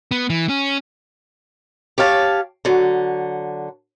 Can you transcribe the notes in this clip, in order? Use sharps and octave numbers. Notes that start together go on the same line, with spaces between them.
B3
E3
C#4
G4 C#5 F5 A5
D3 F#3